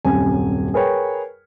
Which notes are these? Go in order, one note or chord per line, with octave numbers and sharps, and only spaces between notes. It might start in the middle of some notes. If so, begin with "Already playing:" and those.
D#1 F#2 C3 G#5
G#4 A#4 B4 C#5 G5